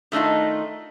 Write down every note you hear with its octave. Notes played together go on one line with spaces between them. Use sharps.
D#3 A3 D4 D#4 F4